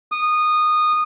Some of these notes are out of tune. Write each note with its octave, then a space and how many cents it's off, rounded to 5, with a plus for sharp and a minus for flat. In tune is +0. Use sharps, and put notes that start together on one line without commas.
D#6 -15